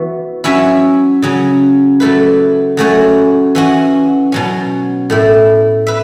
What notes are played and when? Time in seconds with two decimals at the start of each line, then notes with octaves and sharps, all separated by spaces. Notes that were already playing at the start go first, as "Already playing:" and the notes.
Already playing: E3 B3 F#4
0.44 F#3 C#4 E4 C#5 E5
1.22 C#3 F#3 C#4
2.00 F#3 A3 E4 B4
2.77 F#3 A3 C#4 F#4 C#5
3.55 E3 C#4 F#4
4.32 B2 F#3 C#4
5.10 A2 A3 E4
5.87 B4 E5